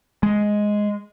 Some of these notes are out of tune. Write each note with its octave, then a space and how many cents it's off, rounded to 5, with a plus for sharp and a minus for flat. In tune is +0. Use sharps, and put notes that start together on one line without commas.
G#3 +5